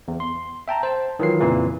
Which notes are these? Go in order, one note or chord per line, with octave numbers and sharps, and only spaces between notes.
E2
C6
E5 G5 A5 A#5
C5 A5
D#3 E3 F#3 F4 C7
F2 A#2 C#3 E3